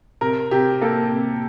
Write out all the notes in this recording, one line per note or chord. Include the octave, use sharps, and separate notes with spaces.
C3 A#4
C3 G4
A#3 A4
C3